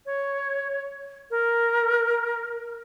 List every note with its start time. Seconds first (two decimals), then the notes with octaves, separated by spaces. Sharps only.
0.06 C#5
1.31 A#4